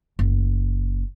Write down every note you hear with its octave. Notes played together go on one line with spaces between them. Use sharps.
F#1